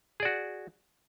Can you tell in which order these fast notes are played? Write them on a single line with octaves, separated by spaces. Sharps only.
G#4 D5 F#4